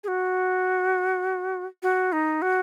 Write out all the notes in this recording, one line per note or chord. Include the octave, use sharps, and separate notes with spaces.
G#4
F#4
F#4
D#4
F#4